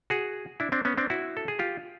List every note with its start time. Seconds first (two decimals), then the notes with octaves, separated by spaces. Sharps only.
0.10 F#4 G#4
0.60 D4 E4
0.72 C4 D4
0.85 B3 C#4
0.98 C4 D4
1.10 E4 F#4
1.37 A4
1.48 G#4
1.59 F4 G4